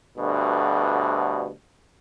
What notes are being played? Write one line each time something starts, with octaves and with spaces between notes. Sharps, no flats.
D2 G2 B2 D3